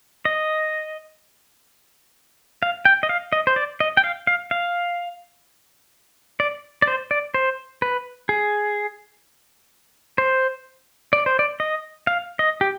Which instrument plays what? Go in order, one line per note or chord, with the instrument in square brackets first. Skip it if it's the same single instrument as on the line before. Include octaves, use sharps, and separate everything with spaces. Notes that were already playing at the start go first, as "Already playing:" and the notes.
[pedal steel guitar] D#5
F5
G5
D#5
F5
D#5
C5
D5
D#5
G5
F5
F5
F5
D5
D5
C5
D5
C5
B4
G#4
C5
D5
C5
D5
D#5
F5
D#5
G4